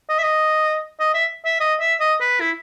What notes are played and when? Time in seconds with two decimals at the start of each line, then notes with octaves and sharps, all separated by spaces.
0.09 D#5
0.19 E5
0.24 D#5
1.00 D#5
1.14 E5
1.45 E5
1.61 D#5
1.80 E5
2.01 D#5
2.21 B4
2.41 E4